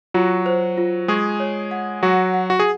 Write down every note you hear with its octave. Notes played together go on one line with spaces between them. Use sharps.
F#3 F4 F#4
C5
F4
G#3 G#4 C#6
C#5
F#5
F#3 F#4 F#5
F#5
F#4
G#4